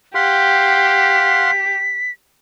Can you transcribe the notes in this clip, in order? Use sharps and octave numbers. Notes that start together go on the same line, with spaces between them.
G4 F5 F#5 C6 B6